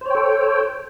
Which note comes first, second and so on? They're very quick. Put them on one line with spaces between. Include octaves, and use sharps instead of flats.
C5 C#5 G5 A4